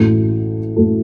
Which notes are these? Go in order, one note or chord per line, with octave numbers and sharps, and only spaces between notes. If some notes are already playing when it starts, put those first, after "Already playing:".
Already playing: A1 A2 A3 F#4 A4
A2 A3 F#4 A4